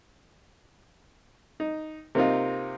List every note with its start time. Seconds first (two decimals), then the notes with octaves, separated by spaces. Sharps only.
1.60 D#4
2.15 C3 A#3 C4 D#4 F4